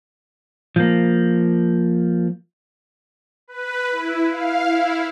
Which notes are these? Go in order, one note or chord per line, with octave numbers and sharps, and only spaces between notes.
F3 A#3
B4
E4
F5
E4